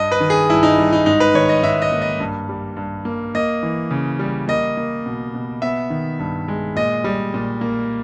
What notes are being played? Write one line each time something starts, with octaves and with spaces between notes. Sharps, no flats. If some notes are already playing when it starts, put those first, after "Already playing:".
Already playing: G2 D#5
B4
D#3
G#4
G2 E4
D#4
G3
D#4
G#2 D#4
B4
D#3 C#5
D#5
G#2 E5
D#5
A#3
D#5
G2
G3
G2
A#3
A#3 D#5
E3
C#3
G3
A#3 D#5
A#3
B2
B2
B3 E5
D#3
G2
G#3
A#2 D#5
G3
A#2
A#3